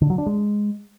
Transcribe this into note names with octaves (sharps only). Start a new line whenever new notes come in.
D3
F#3
D4
G#3